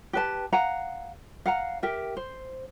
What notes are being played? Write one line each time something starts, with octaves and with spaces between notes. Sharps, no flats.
G4 B4 A5
F5 F#5 A#5
F5 F#5 A#5
G4 A#4 E5
C5